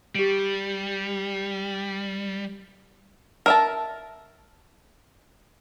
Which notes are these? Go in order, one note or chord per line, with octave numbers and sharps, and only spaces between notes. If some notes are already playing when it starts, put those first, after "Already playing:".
G3 G4 D7
A#4 E5 A5